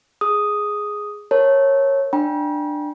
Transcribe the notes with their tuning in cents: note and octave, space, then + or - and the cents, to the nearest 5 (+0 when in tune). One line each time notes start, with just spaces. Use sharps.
G#4 +0 D#6 +0
A#4 +0 C#5 -15 A5 +0
D4 +15 G5 +0 B5 -45